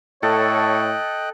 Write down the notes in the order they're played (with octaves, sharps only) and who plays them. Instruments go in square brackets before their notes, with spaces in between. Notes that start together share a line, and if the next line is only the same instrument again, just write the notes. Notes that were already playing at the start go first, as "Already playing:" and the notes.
[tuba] A2 [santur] A4 [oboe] C#5 [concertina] D#5 G5 F#6